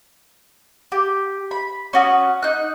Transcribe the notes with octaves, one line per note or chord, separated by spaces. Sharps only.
G4
B5
C#4 F#4 D#6
D#4 F#6